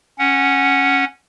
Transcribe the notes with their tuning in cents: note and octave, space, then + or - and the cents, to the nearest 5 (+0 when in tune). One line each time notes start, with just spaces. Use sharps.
C#4 -10 F#5 +0